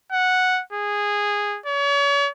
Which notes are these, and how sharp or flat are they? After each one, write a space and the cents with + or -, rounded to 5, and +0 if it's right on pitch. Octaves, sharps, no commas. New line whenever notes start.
F#5 -5
G#4 -15
C#5 +40